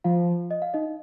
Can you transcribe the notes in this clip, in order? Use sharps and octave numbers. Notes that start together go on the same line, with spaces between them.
F3 F4 F5
D#5
F5
D#4 D#5